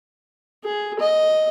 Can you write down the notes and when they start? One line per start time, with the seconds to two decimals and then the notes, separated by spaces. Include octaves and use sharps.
0.64 G#4
0.99 D#5